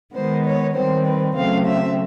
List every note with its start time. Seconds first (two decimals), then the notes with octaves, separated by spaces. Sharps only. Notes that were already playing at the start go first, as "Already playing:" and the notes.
0.14 D#3 G#3 B3 C5
0.45 C#5
0.75 D#3 G3 C4 C5
1.06 B4
1.35 C#3 F#3 A3 C4 F5
1.65 E5